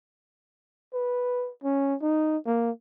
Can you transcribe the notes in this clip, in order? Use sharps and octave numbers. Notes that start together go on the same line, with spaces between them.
B4
C#4
D#4
A#3